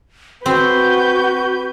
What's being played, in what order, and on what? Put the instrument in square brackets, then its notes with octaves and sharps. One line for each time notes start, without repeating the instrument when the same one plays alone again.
[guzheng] C4 [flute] F#4 [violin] B4 G6